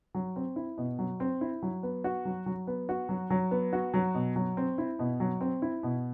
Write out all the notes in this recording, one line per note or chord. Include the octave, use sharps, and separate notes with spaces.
F#3
C4
E4
B2
F#3
C4
E4
F#3
B3
F#4
F#3
F#3
B3
F#4
F#3
F#3
B3
F#4
F#3
B2
F#3
C4
E4
B2
F#3
C4
E4
B2